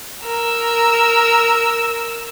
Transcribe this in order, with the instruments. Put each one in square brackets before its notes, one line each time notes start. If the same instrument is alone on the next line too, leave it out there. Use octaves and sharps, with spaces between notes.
[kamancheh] A#4 E6